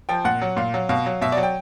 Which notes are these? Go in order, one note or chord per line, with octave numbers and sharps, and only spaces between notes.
F3 G5
A#2 F#5
F#3
A#2 F5
F#3
B2 F5
F#3
B2 E5
F#3 D5
G5